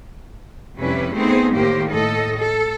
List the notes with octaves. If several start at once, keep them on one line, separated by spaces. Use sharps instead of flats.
F2 C3 G3 C#4 E4 B4
A3 B3 C4 D#4 G#4 C5
A2 D#3 A#3 G4 C5
A2 A4 D#5
A4